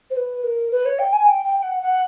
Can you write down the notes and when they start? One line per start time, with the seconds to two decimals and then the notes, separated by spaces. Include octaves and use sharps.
0.10 C5
0.16 B4
0.43 A#4
0.71 B4
0.85 C#5
0.98 G5
1.12 G#5
1.26 G5
1.43 G5
1.62 F#5
1.81 F#5